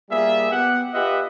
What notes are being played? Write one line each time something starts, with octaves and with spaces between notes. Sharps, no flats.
G3 A#3 F4 G#4 E5
B3 G4 F#5
F4 G4 B4 D#5 E5 F#5